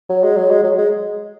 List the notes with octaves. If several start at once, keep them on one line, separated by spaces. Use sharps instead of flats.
F#3
G#3
F#3
G#3
F#3
G#3